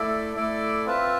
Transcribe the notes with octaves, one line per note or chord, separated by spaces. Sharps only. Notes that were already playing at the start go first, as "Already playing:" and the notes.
Already playing: A3 E4 A4 D5
A3 E4 A4 D5
C4 F4 B4 E5 A5